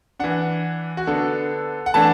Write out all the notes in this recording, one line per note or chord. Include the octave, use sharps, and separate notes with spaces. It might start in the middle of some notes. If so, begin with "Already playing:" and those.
E3 D4 F#5
F#4
D3 B3 D4 A4
F#5
E3 A3 D4 A5